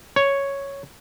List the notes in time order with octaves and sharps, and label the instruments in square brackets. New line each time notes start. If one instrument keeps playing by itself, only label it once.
[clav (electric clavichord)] C#5